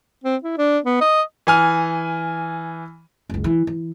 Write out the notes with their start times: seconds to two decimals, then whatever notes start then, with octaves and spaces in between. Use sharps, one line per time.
0.24 C4
0.44 E4
0.58 D4
0.84 B3
1.01 D#5
1.47 E3 G#5 F6
3.30 F#1 C#2
3.44 E3
3.67 E3